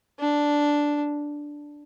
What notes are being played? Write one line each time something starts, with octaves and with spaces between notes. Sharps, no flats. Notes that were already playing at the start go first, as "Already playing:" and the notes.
D4